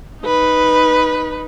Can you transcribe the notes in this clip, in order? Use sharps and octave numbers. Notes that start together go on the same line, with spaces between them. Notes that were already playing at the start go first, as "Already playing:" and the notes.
D#4 B4